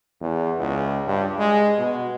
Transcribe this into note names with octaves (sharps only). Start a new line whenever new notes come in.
E2
C#2
G2
G#3
B2